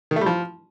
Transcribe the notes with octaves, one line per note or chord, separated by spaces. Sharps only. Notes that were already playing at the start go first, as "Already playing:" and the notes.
D#3
A3
G3
F3